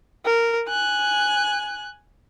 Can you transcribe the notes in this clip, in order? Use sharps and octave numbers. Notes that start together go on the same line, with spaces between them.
A#4
G#5 F#6